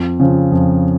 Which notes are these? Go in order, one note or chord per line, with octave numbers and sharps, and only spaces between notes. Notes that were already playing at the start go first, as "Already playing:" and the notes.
Already playing: F2
C#3 F3 C4
F2